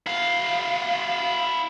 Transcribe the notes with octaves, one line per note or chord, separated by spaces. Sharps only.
E4 F5